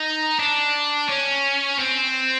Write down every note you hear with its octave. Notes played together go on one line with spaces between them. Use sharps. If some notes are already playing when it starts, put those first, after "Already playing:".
Already playing: D#4
D4
C#4
C4